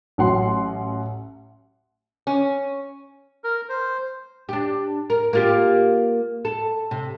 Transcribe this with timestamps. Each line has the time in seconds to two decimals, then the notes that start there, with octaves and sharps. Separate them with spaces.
0.18 A1 F#3 F#5 C6
2.27 C#4
3.44 A#4
3.69 C5
4.49 D4 G4
5.10 A#4
5.33 A#3 F4 G4
6.45 A4
6.91 C3